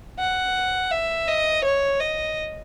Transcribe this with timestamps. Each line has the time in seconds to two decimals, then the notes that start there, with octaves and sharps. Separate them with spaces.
0.19 F#5
0.91 E5
1.28 D#5
1.64 C#5
2.01 D#5